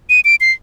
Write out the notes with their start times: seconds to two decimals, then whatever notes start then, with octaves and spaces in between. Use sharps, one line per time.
0.10 D#7
0.25 D7
0.41 C7